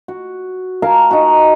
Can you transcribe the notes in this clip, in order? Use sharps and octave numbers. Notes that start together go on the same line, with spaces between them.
F#4
A#4 F5 G#5 A5
D#4 F#4